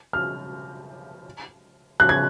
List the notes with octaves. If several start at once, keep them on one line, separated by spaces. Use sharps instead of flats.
F6
F#6
G#6